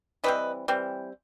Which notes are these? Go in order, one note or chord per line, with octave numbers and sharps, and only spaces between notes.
E3 G3 C4 B4 D#5
E3 G3 C4